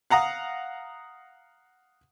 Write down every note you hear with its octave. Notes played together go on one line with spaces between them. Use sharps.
F5 F#5 A#5 D#6